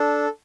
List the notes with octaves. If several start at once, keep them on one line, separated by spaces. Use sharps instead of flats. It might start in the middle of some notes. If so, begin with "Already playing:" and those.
Already playing: D4 A4